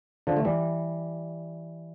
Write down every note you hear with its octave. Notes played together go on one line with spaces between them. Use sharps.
D3 F3
A3
E3 G3